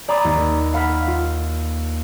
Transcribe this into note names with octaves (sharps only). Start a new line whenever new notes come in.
D5 A#5 B5 D6 D#6 G#6
D#2
F5 F#5 B5 F6 B6 C7
F4